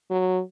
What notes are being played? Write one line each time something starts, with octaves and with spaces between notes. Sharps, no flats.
F#3